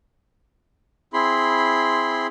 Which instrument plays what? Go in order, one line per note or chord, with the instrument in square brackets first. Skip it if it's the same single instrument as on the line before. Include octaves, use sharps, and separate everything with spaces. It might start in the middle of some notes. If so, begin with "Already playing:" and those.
[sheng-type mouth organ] C4 E4 G#4 B5 C6